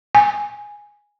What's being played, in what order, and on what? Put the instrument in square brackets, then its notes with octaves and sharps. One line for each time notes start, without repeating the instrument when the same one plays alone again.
[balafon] G#5